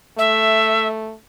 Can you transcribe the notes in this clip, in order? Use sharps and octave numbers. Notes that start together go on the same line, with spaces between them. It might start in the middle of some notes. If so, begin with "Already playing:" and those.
A3 E5